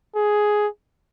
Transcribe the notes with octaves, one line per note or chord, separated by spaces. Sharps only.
G#4